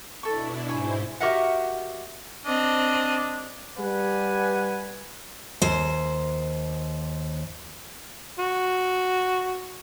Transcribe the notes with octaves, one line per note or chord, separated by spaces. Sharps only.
B2 D4 E4 A4 C#6
G#2 E4 C5 C#5 G#5
F#4 G4 A#4 D#5 E5 F#5
C4 D4 D#5
G3 B4 F#5 G#5
D#2 C5
F#4